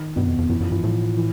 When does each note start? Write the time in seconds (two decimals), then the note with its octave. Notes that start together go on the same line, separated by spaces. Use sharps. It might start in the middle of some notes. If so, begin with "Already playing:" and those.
Already playing: D#3
0.16 G2 B2
0.27 F2
0.39 F2
0.49 F#2 E3
0.61 F#2 F3
0.71 G2 E3
0.83 A2 F3
1.17 E3